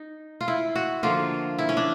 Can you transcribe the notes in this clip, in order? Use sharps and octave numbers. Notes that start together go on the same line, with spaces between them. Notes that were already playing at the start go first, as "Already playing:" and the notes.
Already playing: D#4
F4
E4
F#4
D3 F3 A#3 F4
E4
C#4
D4